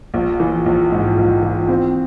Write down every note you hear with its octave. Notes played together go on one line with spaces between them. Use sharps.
A#1
E3
A#1
G#2
A#1
E3
C4